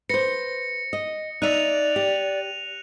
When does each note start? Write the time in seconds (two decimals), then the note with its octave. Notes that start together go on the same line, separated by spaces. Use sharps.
0.09 B4 C5 A#6 C#7
0.93 D#5
1.42 D#4 D5 E5 F#6 D#7 F7
1.96 G4